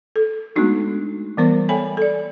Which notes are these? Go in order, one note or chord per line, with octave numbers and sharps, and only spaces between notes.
A4
G#3 A3 B3 D4 D#4 F#4
E3 G3 B3 A#4 C5 C#6
A4 C#5 E5 G5 G#5 B5
A4 D5